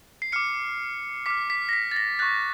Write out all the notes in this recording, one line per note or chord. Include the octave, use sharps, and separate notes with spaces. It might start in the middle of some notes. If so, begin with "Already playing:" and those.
C7
D6 F6 C#7
D6 F6 B6
B6
A#6
B6
A6
A#6
C#6 F#6 A6